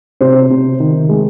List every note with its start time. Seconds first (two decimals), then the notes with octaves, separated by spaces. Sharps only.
0.21 C3 C5
0.50 C3
0.80 D#3
1.09 G#3